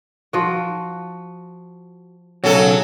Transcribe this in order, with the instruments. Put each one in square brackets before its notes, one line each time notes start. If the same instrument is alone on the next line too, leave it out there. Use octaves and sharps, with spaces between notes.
[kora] F3 F#4
[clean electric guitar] B1 C#3 [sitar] F#3 A4